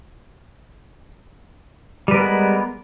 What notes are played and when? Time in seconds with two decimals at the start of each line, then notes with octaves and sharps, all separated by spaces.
2.08 G3
2.11 B4
2.14 A#4
2.17 B3
2.20 G#3